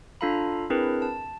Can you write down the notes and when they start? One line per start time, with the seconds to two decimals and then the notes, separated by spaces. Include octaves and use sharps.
0.21 D4 F4 A4 F5 A#5 B5
0.70 C4 D4 E4 G#4 A#4 B4
1.02 A5